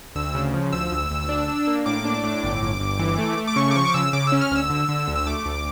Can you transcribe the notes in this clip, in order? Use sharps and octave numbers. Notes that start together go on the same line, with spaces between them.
D2 E6
C#3
F3
D2 E6
D2
D2
D4
D4
A#3
A2 D6
D4
A2
G1
G1
G1
E3
A3
A3
D6
C#3 C#6
D6
F3 C#6
D6
C#3 E6
C#3 D6
E6
C#4
F6
D2 E6
D3
D3
D2
E6
A3 D6
D2